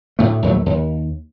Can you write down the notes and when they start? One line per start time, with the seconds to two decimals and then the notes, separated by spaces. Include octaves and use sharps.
0.19 D2 A2 A3
0.43 A#1 D#2 F#3 A3
0.66 D#2